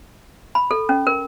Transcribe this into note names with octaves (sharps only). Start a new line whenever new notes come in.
B5
A4
C#4
A#4